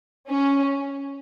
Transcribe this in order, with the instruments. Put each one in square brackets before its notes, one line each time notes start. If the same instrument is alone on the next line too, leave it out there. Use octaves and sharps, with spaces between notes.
[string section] C#4